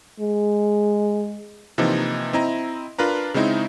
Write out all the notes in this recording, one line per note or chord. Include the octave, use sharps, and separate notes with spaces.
G#3
C3 E3 F3 A#3 D#4
C4 E4 D#5 A#5
D4 F4 A#4 B4 A#5
C#3 G#3 C4 D#4 E4